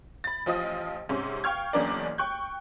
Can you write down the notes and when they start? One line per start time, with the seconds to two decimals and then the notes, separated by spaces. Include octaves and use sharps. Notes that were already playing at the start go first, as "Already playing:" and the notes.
0.24 B5 A6
0.46 A1 F3 F4 D#5 D#6
1.09 G#2 C3 C#4
1.44 F5 G5 C#6 F6 G#6
1.73 F#1 E2 C#4 D4 A#4 D5
2.18 G5 C#6 F#6 G6